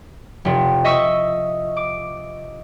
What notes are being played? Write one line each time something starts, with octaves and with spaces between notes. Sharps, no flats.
F1 C3
D#5 E5 C#6 E6
D6